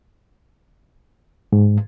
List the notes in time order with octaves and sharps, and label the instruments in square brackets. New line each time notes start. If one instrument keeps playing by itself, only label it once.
[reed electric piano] G#2